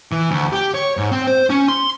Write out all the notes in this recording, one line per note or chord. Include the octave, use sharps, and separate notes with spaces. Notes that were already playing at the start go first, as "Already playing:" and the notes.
E3
D2
G4
C#5
G#2
C4
C5
C#4
C6